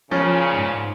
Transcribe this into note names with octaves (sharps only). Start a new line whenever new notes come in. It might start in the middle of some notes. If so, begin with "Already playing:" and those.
A#2 C#3 F3 C#4
G#2